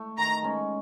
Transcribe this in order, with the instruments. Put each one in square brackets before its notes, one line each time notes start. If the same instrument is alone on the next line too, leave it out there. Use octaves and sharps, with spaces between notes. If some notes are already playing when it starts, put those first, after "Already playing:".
Already playing: [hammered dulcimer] A3
[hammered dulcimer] D#3 [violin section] A#5
[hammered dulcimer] G#3 C#4